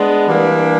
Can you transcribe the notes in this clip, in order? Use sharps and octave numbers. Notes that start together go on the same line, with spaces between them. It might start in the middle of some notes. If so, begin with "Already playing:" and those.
Already playing: G#3 B3 D4
E3 G3 A#3 D4